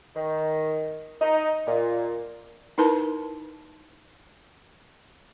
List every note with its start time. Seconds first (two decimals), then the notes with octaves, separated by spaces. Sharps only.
0.16 D#3
1.21 D#4
1.67 A#2
2.78 D#4 E4 A#4 B4 A5